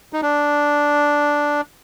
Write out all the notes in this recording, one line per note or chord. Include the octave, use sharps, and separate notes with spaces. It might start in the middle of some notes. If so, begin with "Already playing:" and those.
D#4
D4